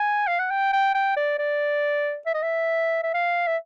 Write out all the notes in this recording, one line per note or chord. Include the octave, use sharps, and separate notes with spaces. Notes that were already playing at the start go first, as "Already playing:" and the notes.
Already playing: G#5
F5
F#5
G5
G5
G5
D5
D5
E5
D#5
E5
E5
F5
E5